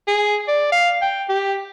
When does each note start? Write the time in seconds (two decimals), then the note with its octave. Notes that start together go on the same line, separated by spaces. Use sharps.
0.08 G#4
0.48 D5
0.72 F5
1.02 G5
1.29 G4